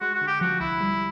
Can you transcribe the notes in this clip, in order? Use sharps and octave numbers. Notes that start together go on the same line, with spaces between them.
G#3 F#4
F#4
D3
G4
F3 F#4
C2 E4
G3